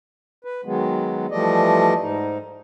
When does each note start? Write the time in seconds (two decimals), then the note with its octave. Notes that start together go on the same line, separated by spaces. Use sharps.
0.45 B4
0.65 D#3 F#3 G#3 B3
1.31 E3 F3 G3 A3 D5 D#5
2.01 G#2 D#4